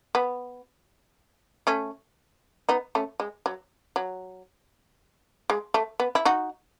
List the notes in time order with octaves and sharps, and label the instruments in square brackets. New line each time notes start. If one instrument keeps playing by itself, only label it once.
[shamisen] B3
A3 C#4
B3 D#4
A3 C#4
G#3
F#3
F#3
G#3
A3
B3
E4
D#4 F#4